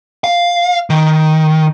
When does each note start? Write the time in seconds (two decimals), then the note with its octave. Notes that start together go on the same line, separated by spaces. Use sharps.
0.24 F5
0.90 D#3